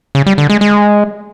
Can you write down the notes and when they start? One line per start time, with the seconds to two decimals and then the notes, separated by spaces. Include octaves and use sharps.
0.15 C#3
0.26 G3
0.38 D3
0.50 G#3
0.61 G#3